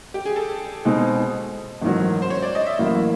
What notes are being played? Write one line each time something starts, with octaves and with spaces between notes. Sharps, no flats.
G4
G#4
A4
B2 G#3 C4 D#4
A1 G#2 D#3 F#3
C5
C#5
D5
D#5
E5
A1 A2 F#3 A#3